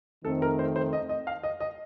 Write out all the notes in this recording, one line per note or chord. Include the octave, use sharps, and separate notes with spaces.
F2 D#3 A3 C4 A4
A#4
C5
C5
D#5
D#5
F5
D#5
D#5